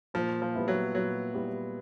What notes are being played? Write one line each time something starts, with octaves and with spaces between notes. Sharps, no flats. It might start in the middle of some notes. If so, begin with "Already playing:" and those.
A#2 F3
F3
G3 B3 E4
F#3
A#2 F#3
G3 B3 E4